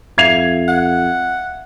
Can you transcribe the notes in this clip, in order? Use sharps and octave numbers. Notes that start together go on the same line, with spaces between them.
F2 E5 F5 G#6 C7 F7
F#5